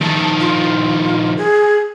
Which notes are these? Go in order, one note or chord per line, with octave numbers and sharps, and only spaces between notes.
D#3 F3 A5
F4
G#4